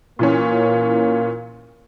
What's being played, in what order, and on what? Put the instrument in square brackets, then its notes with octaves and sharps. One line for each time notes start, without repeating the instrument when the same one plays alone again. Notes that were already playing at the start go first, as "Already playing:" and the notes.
[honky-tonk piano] A#2 E3 C#4 [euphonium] A#3